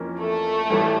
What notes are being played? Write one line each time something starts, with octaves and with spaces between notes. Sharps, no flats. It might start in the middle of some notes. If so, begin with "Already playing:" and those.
Already playing: F2 E3 A#3 C#4
A3
A1 G2 E3 G3